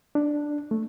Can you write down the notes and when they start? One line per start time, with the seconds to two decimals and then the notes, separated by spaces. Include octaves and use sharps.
0.15 D4
0.71 A3